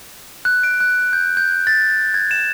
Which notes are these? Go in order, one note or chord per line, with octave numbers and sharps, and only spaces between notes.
F#6
D7
F#6
G6
G6
A6
G#6
E7